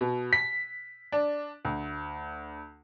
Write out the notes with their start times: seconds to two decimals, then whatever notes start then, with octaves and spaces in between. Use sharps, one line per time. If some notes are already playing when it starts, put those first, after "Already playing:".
0.01 B2
0.33 B6
1.12 D4
1.65 D2